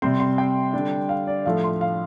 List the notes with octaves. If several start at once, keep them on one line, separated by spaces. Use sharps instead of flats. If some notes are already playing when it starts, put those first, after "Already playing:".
C3 G3 C4 C6
C6
G5
D3 G3 D4
F5
D5
A2 F3 A3 D4 F5
C6
F5